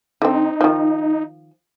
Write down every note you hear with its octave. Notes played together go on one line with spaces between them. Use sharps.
D3 C4 D#4
D#3 F3